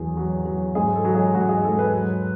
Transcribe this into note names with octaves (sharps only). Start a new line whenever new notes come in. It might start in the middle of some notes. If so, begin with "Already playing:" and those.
Already playing: E2 F#3 G#4
F#3
F#3
G#2 G#4
A4
F#3
G#4
G#2 F#4
G#4
G#2 A4
B4
F#3